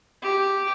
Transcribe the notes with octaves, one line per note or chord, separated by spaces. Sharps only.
G4